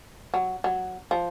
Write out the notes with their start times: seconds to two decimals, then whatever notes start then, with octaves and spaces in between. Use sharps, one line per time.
0.34 F#3
0.64 F#3
1.11 F3